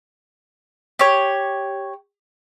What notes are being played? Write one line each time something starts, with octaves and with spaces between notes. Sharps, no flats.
G4 C#5